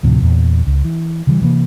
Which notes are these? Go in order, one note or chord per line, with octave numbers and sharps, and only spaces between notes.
D2 A2 C3 F3
E2 A#2
C#2
E3
C#3 E3 G3
C3 E3 A#3